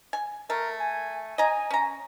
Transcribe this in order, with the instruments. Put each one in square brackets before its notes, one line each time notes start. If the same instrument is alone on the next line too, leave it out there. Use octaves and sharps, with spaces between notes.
[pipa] G#5
[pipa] A3 [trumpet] A#4
[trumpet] G#5
[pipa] D#5 A#5 [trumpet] G#5
[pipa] C#4 A#5